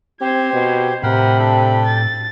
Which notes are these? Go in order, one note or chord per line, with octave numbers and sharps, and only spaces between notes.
C4 G4 C5 G#6
B2
A2 C3 A#4 F#5 G5 B5
D4 A4 G5
A6